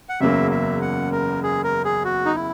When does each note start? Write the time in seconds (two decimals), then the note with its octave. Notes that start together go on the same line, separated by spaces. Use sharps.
0.09 F#5
0.21 F#1 E2 C#3 F#3 A#3 E5
0.51 E5
0.82 F#5
1.12 A#4
1.43 G#4
1.64 A#4
1.85 G#4
2.05 F#4
2.26 D#4
2.35 E4